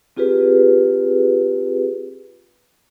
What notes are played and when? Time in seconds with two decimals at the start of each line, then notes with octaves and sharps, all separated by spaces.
0.17 C4 F4 G4 G#4 B4